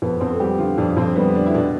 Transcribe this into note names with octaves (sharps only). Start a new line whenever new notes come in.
F2 B3
F2 C4
A4
G3 G4
D3 F4
F2 D4
F2 C4
G3 B3
D3 D4
E4
B2 D4